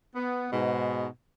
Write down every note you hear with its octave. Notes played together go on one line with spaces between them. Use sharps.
B3
G#2 B2